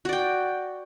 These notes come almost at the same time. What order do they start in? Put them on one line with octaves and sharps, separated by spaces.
F#4 D5 G5